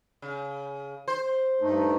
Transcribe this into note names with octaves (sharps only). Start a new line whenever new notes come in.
C#3
C5
G2 A3 D#4